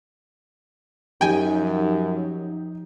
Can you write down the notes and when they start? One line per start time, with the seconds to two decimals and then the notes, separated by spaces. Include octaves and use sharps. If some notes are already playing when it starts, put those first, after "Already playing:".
1.21 F#2 F3 D#4 G4 G5 G#5